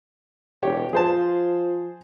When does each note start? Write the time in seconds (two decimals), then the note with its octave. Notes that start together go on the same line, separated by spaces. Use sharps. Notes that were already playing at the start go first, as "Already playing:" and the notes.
0.63 E1 G4 C#5
0.93 F3 G#4 C5 A5